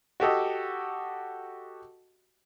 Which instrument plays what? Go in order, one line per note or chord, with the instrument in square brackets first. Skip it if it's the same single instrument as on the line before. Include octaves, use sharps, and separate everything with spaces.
[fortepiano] F#4 G4 A4 D#5